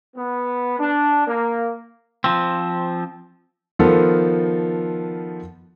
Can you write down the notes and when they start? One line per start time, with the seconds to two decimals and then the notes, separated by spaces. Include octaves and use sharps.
0.15 B3
0.78 D4
1.27 A#3
2.24 F3 C4
3.79 D#3 F3 B3 F4 A4